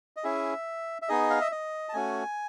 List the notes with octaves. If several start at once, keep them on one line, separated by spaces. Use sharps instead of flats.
D#5
C#4 E4 G#4 E5
E5
B3 D#4 G#4 D#5
F5
E5
D#5
A5
A3 C#4 F#4 G#5